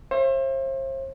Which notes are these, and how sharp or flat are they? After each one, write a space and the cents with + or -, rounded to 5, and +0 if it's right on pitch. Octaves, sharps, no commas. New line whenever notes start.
C5 +40 E5 +30